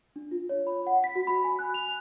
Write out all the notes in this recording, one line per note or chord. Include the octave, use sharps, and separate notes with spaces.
D4
F4
C#5
B5
F#5
B6
F#4
B5
G#5
F#6
F7